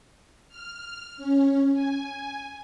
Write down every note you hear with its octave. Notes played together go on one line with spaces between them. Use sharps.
F6
C#4
G#5